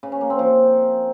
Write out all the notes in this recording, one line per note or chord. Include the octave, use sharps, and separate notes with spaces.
C#3
C#4
A#3
C4
F3